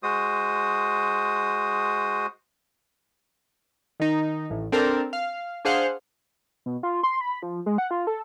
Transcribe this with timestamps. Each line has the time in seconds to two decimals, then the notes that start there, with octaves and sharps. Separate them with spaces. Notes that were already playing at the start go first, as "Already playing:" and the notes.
0.03 G#3 F#4 C5 D#6
4.00 D#3 D#4
4.50 A1 A2
4.72 C4 D4 A4 A#4
5.13 F5
5.65 D4 G#4 C5 F5 F#5
6.66 B2
6.83 F4
7.03 C6
7.21 B5
7.42 F3
7.66 G#3
7.78 F#5
7.91 F4
8.07 A4